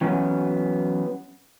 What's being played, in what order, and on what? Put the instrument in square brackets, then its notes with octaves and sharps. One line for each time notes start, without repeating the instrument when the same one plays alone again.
[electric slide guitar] E3 F#3 B3 C#4 F#4